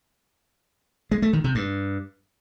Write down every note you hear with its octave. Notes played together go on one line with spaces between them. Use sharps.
G#3
A3
D#3
C3
G2